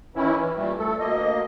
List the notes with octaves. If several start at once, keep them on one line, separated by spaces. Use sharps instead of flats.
D#3 E3 C#4 E4
E3
A#2 G3 A3
A3 A4
D2 A#3 D#5